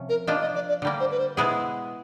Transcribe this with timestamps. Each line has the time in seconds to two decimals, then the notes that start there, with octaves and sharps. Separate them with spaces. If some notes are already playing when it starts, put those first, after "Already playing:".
Already playing: C3 F3 C#4
0.09 A#4
0.27 F3 A#3 D4 F4 D#5
0.42 D#5
0.55 D5
0.69 D5
0.82 D3 G3 A#3
1.00 C5
1.11 B4
1.19 C5
1.37 B2 G#3 B3 E4 G#4